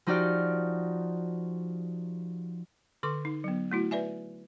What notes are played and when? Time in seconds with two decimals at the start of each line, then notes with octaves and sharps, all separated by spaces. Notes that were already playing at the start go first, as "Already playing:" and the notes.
0.06 F3 D#4 F#4 G4 D5 F6
3.03 D3 A4 C#6 D6
3.25 D#4
3.44 F#3 B3
3.71 A3 E4 F#4
3.91 B4 D5 E5 G#5